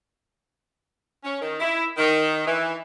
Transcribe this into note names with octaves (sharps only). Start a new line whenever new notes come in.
C#4
D#3
E4
D#3
E3